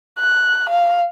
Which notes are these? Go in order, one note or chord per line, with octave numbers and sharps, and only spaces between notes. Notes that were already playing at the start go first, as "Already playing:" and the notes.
F#6
F5